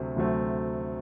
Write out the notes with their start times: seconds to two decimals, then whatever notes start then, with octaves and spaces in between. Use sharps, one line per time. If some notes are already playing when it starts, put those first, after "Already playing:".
Already playing: D2 C3 F#3 A3 C4
0.16 D2 C3 F#3 A3 C4